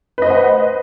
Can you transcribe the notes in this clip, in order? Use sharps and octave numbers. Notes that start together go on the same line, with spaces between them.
B4 C5 D#5 F#5